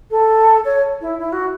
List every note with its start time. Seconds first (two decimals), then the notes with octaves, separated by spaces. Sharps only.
0.11 A4
0.65 C#5
1.01 E4
1.19 E4
1.32 F#4